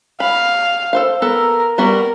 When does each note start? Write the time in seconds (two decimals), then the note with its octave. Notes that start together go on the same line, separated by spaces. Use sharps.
0.20 F5 B5
0.93 A4 C5 F5
1.22 B3 A4 A#4
1.78 G3 B3 F#4 A#4